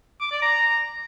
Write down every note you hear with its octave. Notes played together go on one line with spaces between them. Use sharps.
D6
D5
A#5